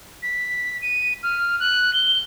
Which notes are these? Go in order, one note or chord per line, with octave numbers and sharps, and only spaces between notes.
B6
D#7
F6
F#6
G7